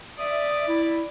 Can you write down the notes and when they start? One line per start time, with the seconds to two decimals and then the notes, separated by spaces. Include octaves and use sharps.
0.19 D5 E5 D#6
0.68 E4